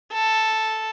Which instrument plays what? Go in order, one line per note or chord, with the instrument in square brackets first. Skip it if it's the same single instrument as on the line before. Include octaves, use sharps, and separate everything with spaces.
[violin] A4